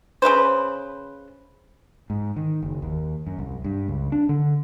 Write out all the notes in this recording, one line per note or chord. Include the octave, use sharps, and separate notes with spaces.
C#3 G#3 B4 C5
G#2
D#3
F#1
D#2
F#2
C2
G2
C#2
D4
D3